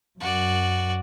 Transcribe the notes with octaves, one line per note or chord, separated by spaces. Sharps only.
F#2 F#4 D5